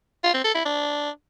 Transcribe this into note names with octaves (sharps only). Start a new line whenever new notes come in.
F4
C4
A4
E4
D4